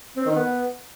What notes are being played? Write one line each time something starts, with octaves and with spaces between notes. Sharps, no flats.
C4
D#3
B3